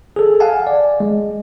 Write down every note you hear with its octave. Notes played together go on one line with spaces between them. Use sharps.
G#4 A4
F5 F#5 G#5 A5
D5
G#3